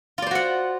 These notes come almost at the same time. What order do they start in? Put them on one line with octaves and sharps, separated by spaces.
F4 D5 C5 F#4 F#5